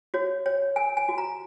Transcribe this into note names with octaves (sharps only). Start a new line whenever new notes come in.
F#4 C#5
C#5
A#4 G#5
G#5
F#4
A#5